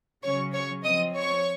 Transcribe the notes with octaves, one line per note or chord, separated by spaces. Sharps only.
C#3 F#3 C#4 C#5 C#6
C#5 C#6
F3 C4 D#5 D#6
C#5 C#6